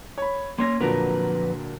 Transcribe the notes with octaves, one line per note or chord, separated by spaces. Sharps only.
C#5 B5
A#3 C#4 C#5 C6 A#6
F2 A#2 D3 F#3 B4 A#5